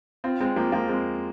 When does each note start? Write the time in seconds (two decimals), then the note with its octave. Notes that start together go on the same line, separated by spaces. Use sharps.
0.24 C4 F4
0.40 G#3 C4
0.56 F3 A#3
0.72 F3 A#3
0.88 G#3 C4